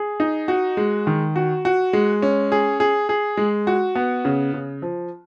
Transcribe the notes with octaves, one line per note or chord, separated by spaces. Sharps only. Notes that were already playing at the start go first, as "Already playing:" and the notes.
Already playing: G#4
D#4
F#4
G#3
D#3
F#4
F#4
G#3
C#4
G#4
G#4
G#4
G#3
F#4
B3
C#3
C#3
F3